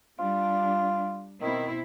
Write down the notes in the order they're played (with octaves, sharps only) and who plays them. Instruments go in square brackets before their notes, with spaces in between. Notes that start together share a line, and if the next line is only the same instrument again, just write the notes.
[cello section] G3 D4 [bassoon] F4
[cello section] B2 C4 E4 [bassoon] D#3